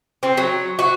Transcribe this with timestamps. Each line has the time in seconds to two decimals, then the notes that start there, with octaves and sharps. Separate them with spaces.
0.23 C4
0.37 F#3
0.79 F#4